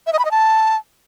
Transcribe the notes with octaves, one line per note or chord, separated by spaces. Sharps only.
E5
D#5
B5
D#5
A5